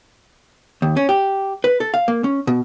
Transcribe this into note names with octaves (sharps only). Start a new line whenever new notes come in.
D#2
C#4
G4
B4
A4
F5
A#3
C#4
B2